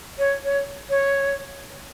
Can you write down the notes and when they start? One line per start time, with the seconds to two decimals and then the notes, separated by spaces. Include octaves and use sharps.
0.19 C#5
0.45 C#5
0.90 C#5